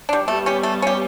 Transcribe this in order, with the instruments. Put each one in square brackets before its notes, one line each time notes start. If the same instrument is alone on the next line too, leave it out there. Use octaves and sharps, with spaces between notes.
[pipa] G3 D4
[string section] G3 B3 [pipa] A3
[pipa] C#4 G4
A3
C#4 G4